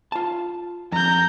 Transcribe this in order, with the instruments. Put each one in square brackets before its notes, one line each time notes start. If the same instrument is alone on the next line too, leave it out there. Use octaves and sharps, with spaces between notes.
[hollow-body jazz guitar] F4 A5
[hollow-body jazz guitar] F2 [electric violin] A#5 G6